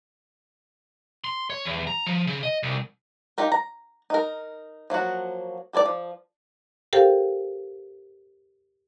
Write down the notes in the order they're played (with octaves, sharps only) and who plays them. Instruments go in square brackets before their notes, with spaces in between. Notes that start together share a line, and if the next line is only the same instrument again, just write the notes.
[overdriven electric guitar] C6
C#5
E2
A#5
F3
C#3
D#5
C2
[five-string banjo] D#4 F4 G4 A#4
A#5
D#4 A#4
F3 F#3 A#3 F#4
G4 A4 C#5 D5
F3
[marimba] G4 A4 A#4 C5 F5 G5